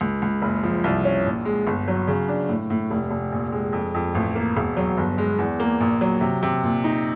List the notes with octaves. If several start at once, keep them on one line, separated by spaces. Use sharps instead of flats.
C#2
C#2
F#1
F3
C2
C#4
A#1
G#3
G1
F#3
C#3
D4
A2
A2
F1
F1
A#1
G#3
F2
F2
A1
A#3
E1
F#3
G1
G#3
E2
A#3
A#1
F#3
C3
C3
A#2
D#4